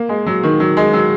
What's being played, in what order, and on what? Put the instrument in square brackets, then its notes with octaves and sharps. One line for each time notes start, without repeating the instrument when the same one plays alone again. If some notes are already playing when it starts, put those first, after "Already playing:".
Already playing: [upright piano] A#3
G#3
F#3
D#3
F#3
G#3
F#3